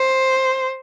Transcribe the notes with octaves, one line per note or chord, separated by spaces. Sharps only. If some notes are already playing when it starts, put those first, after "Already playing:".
Already playing: C5